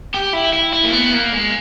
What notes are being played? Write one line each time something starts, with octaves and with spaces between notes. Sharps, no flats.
G4
E4
E4
E4
A#3
B3
A#3
G#3